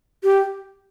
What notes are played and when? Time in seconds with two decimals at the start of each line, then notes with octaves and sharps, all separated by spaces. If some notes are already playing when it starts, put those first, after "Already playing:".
0.24 G4